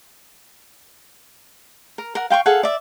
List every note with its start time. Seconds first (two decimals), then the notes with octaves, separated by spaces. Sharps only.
1.98 A#4
2.15 A#4 F#5
2.30 F5 G5 C6 C#6
2.46 G#4 A4 F5 F#5
2.63 D5 E5